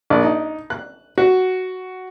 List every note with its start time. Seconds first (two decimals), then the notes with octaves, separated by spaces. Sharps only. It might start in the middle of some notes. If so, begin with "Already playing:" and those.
0.10 A#1
0.23 D#4
0.70 F#6
1.18 F#4